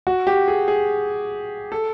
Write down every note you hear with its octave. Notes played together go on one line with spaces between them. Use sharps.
F#4
G4
G#4
G#4
A4